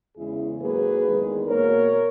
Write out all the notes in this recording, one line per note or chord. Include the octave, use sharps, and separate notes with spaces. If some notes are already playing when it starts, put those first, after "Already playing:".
E2 C#3 G#3 E4 G#4
G#2 F#3 A#3 G#4 B4
E2 D#3 G#3
B2 A#3 A#4 C#5